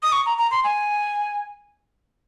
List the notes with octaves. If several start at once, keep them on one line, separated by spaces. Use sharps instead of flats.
D#6
C#6
A#5
A#5
C6
G#5